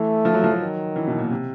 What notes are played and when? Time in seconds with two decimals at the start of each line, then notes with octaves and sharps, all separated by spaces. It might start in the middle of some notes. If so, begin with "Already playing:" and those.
Already playing: E3 A3
0.25 F3
0.34 F#3
0.44 F3
0.52 F#3
0.61 D#3
0.96 E3
1.07 B2
1.18 A#2
1.31 C3